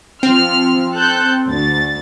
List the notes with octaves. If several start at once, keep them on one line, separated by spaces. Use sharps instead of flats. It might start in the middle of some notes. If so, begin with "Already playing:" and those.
F3 C4 F6
A4 F#6 G6
D2 A6